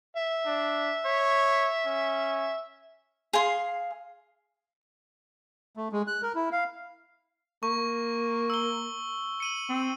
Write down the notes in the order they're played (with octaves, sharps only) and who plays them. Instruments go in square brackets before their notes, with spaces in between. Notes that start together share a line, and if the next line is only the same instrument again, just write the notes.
[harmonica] E5
[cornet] D4
C#5
C#4
[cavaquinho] G#4 F5 C6
[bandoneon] A3
G#3
F#6
A#4
E4
F5
[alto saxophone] A#3 [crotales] C#6
[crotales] E6 G7
C#7 D#7 F#7
[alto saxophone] C4